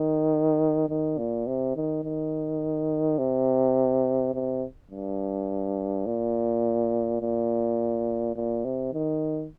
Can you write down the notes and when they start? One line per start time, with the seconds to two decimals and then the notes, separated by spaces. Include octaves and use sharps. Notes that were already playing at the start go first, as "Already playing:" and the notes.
Already playing: D#3
0.89 D#3
1.18 A#2
1.47 C3
1.76 D#3
2.04 D#3
3.19 C3
4.34 C3
4.91 G2
6.06 A#2
7.21 A#2
8.36 A#2
8.65 C3
8.93 D#3